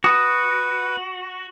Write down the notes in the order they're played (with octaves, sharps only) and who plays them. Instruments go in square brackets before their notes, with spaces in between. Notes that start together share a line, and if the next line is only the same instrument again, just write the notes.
[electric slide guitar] F#4 [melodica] B4 [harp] D#6